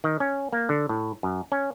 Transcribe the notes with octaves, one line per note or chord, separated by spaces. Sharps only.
D#3
C#4
A#3
D3
A2
F#2
C#4